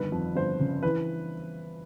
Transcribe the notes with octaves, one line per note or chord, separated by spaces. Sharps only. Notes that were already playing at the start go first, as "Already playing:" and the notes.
Already playing: G1 D#3 B4
F2
G1 C5
C#3
E3 B4